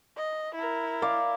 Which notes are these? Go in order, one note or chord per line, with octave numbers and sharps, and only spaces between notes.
D#5
E4 A#4
D5 F5